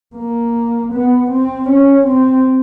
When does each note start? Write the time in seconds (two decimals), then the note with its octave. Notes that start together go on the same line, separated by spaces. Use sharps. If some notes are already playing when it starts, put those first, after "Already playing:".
0.16 A#3
0.93 B3
1.31 C4
1.69 C#4
2.07 C4